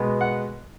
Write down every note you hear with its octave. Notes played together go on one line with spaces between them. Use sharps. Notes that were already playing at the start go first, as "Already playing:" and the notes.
Already playing: B2 G#3 B3
F#5